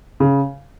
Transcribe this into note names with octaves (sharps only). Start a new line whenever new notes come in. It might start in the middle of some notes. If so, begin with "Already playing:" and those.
C#3